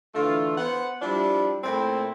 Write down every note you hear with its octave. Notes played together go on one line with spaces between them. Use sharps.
D3 E3 A3 F4
B3 C5 F#5
F3 G3 D4 E4
A#2 A3 C4 E4 C5